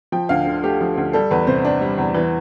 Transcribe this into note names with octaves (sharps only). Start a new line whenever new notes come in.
F3 G5
D2 F5
D3
A3 G4
F3
D2
G3 A4
E2 B4
C3 C5
D4
G3
E2
E3